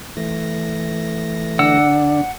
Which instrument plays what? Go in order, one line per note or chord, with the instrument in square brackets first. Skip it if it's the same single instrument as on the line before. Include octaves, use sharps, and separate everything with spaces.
[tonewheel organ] E3 A3 A#6
[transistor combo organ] D3 D4 [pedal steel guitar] F#5 E6